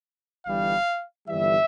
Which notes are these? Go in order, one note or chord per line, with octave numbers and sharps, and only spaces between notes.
G1 G2 E3 G3 F5
G1 G2 E3 G3 E5